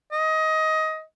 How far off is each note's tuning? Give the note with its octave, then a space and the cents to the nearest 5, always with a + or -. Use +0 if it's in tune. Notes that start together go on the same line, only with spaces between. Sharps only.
D#5 +20